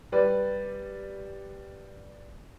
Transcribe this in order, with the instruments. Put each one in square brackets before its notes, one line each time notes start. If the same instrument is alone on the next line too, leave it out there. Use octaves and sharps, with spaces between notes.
[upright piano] G3 B4 D5